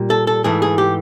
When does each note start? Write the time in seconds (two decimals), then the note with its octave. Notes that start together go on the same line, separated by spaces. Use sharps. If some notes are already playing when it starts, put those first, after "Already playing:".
Already playing: A#2 G3
0.10 A4
0.27 A4
0.44 G#2 E3 A3 G#4
0.62 G#4
0.78 G4